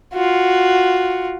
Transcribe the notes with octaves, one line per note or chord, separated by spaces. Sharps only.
F4 F#4